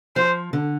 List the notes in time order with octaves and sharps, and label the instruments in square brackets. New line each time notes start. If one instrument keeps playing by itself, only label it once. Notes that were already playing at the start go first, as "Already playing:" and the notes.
[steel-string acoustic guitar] F3 [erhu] C5
[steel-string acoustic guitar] D3